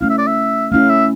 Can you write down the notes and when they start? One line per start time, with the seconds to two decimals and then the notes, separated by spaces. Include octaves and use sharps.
0.01 A3 C#4 E4 F5
0.09 E5
0.18 D5
0.27 E5
0.72 A3 C#4 E4 F5
0.89 E5